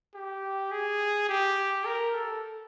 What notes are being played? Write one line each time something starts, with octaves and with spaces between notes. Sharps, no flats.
G4
G#4
G4
A#4
A4